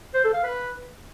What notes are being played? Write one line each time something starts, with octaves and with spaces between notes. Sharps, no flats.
C5
A4
F5
B4